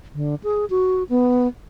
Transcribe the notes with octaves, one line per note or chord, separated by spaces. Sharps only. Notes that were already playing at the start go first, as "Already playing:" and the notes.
D3
G#4
F#4
B3